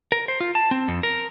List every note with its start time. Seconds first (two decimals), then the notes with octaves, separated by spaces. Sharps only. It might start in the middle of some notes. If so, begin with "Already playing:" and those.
0.12 A#4
0.28 C5
0.41 F4
0.55 A5
0.71 C4
0.88 F2
1.03 A#4